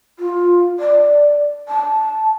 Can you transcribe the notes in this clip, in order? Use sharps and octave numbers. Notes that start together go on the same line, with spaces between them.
F4
D5
A5